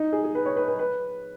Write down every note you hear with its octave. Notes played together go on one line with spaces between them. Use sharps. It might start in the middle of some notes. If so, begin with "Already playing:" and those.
Already playing: D#4
G#4
G#4
B4
C#5
B4
B4
B4